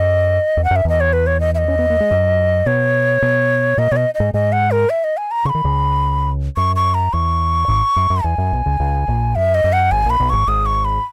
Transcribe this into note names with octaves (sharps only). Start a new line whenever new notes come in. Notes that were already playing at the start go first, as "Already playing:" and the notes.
Already playing: F#2 D#5
E2
F#5
F#2
E5
E2 E3 D#5
C#5
B4
C#5
D#5
E5
D#5
C#4
B3
A#3
G#3
F#2 F#3
B2 B3 C#5
B2 B3
A#2 A#3 D#5
B2 B3 C#5
D#5
D#5
G#2 G#3
G#2 G#3 D#5
F#5
A#4
E5
D#5
G#5
A#5
C#3 C#6
B5
D#3
C#2 C#3
F#2 C#6
C#6
A#5
E2 C#6
G#1 G#2
F#2
F#2
E2 G#5
F#2
B1 B2
C#2 C#3
C#2 C#3
A#1 A#2
F#2 E5
D#5
F#2
F#5
G#1 G#2 G#5
A#1 A#2 B5
B1 B2
G#1 G#2 C#6
G#1 G#2 D#6
C#6
B5